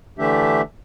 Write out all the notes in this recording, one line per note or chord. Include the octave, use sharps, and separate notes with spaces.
D3 E3 A3 D4 G4 E5